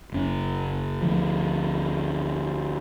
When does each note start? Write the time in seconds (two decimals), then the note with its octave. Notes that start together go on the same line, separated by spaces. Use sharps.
0.12 F#1 C#4
1.02 D2 F3